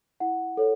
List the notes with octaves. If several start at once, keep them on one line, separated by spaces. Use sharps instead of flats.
E4 F#5
A4 C#5